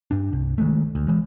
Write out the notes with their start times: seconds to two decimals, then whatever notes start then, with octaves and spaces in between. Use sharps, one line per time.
0.11 G2 D4
0.32 C2
0.58 D#3 G#3 A3
0.95 D2
1.08 E3 G#3